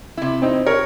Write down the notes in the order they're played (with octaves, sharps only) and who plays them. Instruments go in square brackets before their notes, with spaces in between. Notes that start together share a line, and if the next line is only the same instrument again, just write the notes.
[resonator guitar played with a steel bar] C3 E4
[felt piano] C4 D#4
[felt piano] A#4 [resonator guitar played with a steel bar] C#5